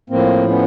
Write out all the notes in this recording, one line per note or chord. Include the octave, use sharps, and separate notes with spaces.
A2 F3 A#3 C4
B3 C#4